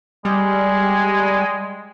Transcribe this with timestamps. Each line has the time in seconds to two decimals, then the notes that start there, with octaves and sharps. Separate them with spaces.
0.25 G3 G#3